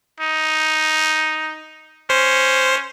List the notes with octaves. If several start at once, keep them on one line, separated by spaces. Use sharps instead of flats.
D#4
C#4 C5